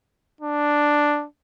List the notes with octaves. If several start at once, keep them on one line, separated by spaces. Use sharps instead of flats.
D4